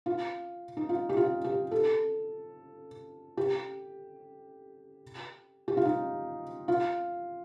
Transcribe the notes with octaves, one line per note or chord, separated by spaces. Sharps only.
F4
D#4
F4
G4
F4
G4
A4
G4
G4
F4
D#4
F4